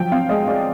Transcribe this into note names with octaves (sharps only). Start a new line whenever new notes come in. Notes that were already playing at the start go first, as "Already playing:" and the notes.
Already playing: F3 F#3 G5
C4 F5
G#3 D#5
G#3 D5